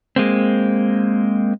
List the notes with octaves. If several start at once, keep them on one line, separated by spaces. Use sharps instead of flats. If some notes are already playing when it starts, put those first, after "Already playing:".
G#3 A#3 C4